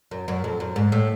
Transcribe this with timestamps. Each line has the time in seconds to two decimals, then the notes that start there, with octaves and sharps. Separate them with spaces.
0.11 F#2
0.28 F#2
0.44 F2
0.60 F#2
0.76 G#2
0.92 A2